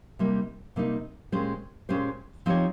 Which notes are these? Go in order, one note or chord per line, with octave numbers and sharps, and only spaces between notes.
C3 G3 A#3 D#4
C3 G3 A#3 D#4
A#2 G#3 C#4 G4 C5
A#2 G#3 C#4 G4 C5
F3 C4 D#4 G4 C#5